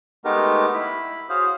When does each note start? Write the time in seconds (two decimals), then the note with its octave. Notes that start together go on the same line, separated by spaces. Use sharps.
0.25 G#3 A3 B3 D#4 G4 A#4
0.74 E4 B5
1.29 F#4 G#4 C5 C#5 F5